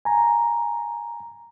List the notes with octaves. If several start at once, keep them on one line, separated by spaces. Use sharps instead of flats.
G#5 A#5